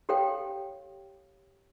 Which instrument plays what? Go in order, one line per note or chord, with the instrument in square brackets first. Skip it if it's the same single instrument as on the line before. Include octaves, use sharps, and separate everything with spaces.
[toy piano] G4 A4 C#5 F5 G5